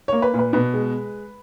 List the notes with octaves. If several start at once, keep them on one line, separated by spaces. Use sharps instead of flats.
A#3 C#5
B4
A#2
B4
B2 B4
G#3